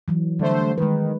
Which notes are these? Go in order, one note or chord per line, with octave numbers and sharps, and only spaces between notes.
E3 F#3
D3 G3 A3 C5
D#3 G#3 B4